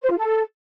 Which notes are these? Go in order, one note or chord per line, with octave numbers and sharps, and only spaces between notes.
C5
F4
A4